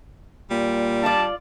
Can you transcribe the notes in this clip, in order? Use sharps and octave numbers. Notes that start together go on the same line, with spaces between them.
A#2 G3
F4 D5 A5